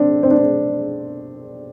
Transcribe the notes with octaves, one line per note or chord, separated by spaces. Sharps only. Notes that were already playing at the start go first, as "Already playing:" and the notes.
Already playing: C4 D4
C4
D4
C4